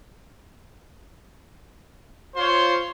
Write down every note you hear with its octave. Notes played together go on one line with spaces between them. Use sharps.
F4 C5 C#5 C6